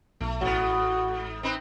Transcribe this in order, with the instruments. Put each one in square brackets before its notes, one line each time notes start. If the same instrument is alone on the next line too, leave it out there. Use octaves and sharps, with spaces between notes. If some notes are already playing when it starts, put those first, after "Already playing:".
[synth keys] B1 [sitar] A3
[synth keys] A1 [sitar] G#2 B3 [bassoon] F#4
[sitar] C4 D#4 B4